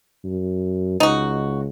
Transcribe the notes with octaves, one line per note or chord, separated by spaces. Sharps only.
F#2
C#2 D#4 F#4